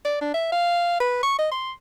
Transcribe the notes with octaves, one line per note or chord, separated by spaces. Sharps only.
D5
D4
E5
F5
B4
C#6
D#5
C6